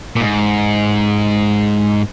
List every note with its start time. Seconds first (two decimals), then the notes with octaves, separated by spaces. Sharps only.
0.16 A#2
0.21 G#2